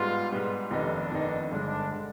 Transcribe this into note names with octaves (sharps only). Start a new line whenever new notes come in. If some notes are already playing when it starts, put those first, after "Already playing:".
Already playing: G#2 G3 B3 F4
G#2 G3 B3
F1 F2 D#3 B3 D4 D#4
F1 F2 D#3 B3 D#4
G1 G2 D3 G#3 D4
D3 G#3